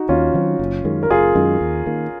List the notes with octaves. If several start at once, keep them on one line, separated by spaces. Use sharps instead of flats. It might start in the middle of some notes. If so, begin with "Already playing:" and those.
Already playing: D#4 F#4
D#2 C#4 F4
D#3 F#3 C4
F#1
F#2 D#3 G#3
A#4
F#1 F4 G#4
F#2 D#3 G#3
D#2
D#3 A#3